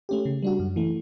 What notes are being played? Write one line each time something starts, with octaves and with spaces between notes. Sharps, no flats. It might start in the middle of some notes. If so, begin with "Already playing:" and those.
A3 C#4 G4
C#3
G3 D4 F#4
F#2
E3 A3